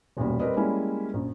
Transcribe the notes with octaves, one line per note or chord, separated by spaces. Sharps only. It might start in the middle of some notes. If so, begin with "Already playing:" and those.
E1 B1 F#2 A#2 G3
G3 C4 A#4 B4 D5 D#5
G3 G#3 A#3 C#4 E4
A#1 F#2